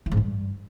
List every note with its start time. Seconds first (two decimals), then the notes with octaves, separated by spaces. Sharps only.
0.06 E3
0.12 G#2
0.17 G2